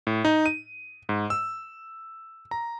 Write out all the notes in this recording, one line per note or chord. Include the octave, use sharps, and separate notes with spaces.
A2
D#4
D#7
G#2
E6
A#5